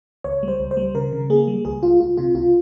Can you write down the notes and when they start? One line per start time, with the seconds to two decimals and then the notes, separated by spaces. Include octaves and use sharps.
0.24 C#2 C#5
0.43 G3
0.48 C5
0.60 C#2
0.71 C5
0.77 G3
0.95 C#3 A#4
1.13 C#3
1.30 A#3 G#4
1.48 G3
1.65 C#2 G#4
1.83 C#2 F4
2.00 C#2 F4
2.17 C3 F4
2.35 C#2 F4